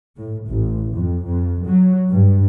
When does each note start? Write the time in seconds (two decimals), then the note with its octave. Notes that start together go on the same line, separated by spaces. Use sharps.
0.17 A2
0.47 A1
0.94 F2
1.26 F2
1.64 F#3
2.08 G2